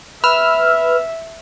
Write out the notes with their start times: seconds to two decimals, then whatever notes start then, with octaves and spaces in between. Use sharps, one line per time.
0.24 B4 E5 E6 F6